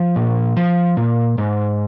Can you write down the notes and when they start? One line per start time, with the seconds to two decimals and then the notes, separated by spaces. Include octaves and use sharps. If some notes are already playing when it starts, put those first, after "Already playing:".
Already playing: F3
0.16 A#2
0.57 F3
0.97 A#2
1.38 G#2